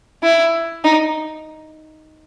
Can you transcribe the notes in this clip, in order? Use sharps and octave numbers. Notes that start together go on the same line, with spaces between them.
E4
D#4